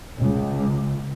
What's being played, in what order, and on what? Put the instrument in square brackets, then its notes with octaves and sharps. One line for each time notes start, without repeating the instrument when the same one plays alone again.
[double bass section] C#2